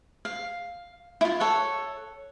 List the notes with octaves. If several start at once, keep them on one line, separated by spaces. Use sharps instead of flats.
F5
E4 F4
A4 C#5 F#5